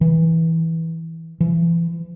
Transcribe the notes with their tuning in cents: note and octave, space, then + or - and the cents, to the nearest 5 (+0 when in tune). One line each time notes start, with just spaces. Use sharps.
E3 -15
E3 +35